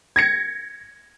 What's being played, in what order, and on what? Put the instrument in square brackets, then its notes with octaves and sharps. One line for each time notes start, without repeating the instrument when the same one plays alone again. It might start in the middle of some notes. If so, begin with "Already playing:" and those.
[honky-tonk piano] G#6 A#6 C#7